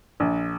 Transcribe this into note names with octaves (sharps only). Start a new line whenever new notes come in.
A#1